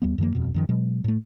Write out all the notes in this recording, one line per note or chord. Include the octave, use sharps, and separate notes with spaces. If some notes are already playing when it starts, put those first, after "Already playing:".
D#2 G3 B3
F#2 D#3 F3 A#3
D#1 F2 B2
F#2 D#3 F3
B2 F#3 G#3
A2 A3